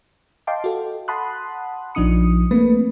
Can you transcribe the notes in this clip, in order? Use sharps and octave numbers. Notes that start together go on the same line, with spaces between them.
D#5 F5 G5 A5 C6 D6
F#4 A4
F#5 A5 B5 C6 D#6 F#6
A#1 F3 D4 D#4 D#6 C#7
A3 A#3 C4 B4